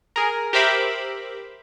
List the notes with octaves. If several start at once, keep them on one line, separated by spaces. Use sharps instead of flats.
G#4 A#4
G4 A#4 C5 E5 B5 D6